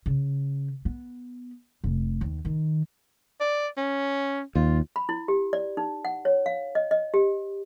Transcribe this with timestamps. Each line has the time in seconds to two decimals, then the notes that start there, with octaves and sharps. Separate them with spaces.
0.06 C#3
0.85 B3
1.84 F1
2.21 D#2
2.45 D#3
3.40 D5
3.77 C#4
4.55 D#2 F4
4.96 B5
5.09 E4
5.28 G4
5.53 D5
5.77 D#4
6.05 F#5
6.25 C#5
6.46 F5
6.75 D#5
6.91 D#5
7.14 G4